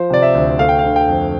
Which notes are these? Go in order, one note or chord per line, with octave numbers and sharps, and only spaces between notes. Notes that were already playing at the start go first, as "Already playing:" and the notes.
Already playing: F3 C5
C3 D5
E5
D2
A3 F5
G5
F5
D3
G5
F2